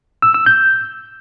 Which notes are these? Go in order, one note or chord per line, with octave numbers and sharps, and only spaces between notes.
E6
E6
G6